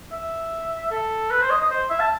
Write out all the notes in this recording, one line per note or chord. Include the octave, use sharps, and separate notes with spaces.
E5
A4
B4
C5
D#5
D#5
C5
E5
A5